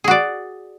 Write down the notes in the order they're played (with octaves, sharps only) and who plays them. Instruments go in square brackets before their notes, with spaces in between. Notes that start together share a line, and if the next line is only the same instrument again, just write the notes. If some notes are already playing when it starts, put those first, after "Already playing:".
[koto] G#4
F#4
D5